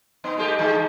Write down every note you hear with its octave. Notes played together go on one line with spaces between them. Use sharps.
B3 D#4
G#3 A3 G4
D3 G#3